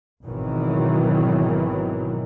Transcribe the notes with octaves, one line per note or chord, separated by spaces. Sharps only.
G#1 B2 D#3 E3 F#3